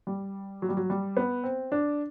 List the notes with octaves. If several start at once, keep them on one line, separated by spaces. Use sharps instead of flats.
G3
F#3
G3
F#3
G3
B3
C4
D4